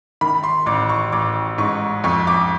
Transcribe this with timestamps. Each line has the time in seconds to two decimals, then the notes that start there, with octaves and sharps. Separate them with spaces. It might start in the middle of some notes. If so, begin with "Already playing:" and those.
0.21 D#3 B5
0.44 C6
0.66 A1 D6
0.89 C#6
1.12 A1 D6
1.58 G#2 C#6
2.04 F2 C#6
2.27 D6